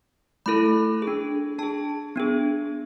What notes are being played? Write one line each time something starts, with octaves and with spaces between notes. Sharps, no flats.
A3 E4 A4 B5
G#4
D4
D4 G#4 A5
B3 D4 G#4